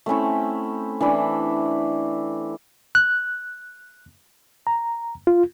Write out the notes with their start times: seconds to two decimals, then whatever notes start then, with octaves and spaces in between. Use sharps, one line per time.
0.06 A3 C4 C#4 E4
1.01 E3 D4 E4
2.95 F#6
4.67 A#5
5.27 F4